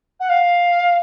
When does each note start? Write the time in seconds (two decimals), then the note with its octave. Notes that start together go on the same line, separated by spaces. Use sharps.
0.20 F#5
0.29 F5